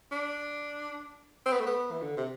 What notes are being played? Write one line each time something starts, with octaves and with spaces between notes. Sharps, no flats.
D4
C4
B3
A3
B3
E3
D3
C3